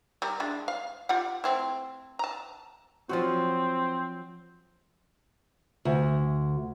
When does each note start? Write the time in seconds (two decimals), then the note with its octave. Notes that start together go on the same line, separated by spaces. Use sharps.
0.22 G3 A#4
0.40 G#3 D4 E4
0.68 F5
1.09 F4 G4 F#5
1.44 A3 C4 E4
2.19 A5 A#5
3.09 F3 F#3 C4 F#4
5.85 D2